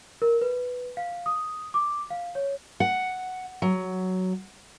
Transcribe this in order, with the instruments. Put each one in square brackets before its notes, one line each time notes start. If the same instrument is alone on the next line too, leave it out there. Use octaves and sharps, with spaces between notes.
[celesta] A#4
B4
F5
D#6
D6
F5
C#5
[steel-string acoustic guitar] F#5
F#3